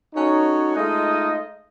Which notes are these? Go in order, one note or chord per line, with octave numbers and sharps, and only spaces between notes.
C#4 D#4 F#4 A4 C#5
G#3 A3 D#4 F4 D#5